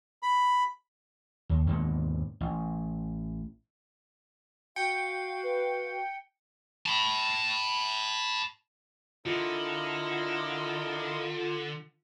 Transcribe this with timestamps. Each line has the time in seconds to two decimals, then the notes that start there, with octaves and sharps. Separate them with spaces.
0.23 B5
1.49 D#2
1.67 D#2 G#2 B2 D3
2.41 A1
4.76 F#4 F5 G5 C#7
5.43 B4
6.86 A5 B5
9.26 D3 E4 F4 A#4 D#5